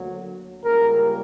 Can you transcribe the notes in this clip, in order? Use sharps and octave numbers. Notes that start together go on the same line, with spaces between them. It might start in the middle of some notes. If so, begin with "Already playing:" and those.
Already playing: D2 D3 F#3 A#3
C#2 C#3 G3 A#3 A#4